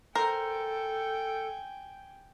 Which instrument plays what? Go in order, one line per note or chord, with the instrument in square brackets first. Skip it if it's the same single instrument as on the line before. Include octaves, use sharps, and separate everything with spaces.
[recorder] A4 [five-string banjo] A#4 C5 [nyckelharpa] G5 G#5